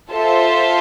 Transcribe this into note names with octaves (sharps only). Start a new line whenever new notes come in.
F4 A4 C5 E5 A5